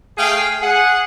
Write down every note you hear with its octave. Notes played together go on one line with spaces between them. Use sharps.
A3 G#4 F5 G5
G#4 F#5